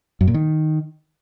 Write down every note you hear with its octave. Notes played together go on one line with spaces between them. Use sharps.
F#2
A#2
D#3